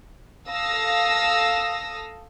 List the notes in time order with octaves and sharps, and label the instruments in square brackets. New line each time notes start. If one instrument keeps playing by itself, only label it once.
[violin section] A4 F5 D#6 E6 A#6